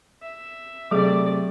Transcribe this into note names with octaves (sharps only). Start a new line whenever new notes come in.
E5
C3 F#3 A3 G#4 D5 D6